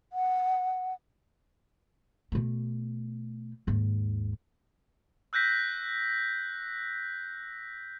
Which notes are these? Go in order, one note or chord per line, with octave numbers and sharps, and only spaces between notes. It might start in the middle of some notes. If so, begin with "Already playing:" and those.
F#5
B2 A3
D#2 G#2
E6 F#6 G6 A#6 B6